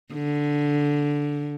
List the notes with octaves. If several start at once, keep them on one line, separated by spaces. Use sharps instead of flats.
D3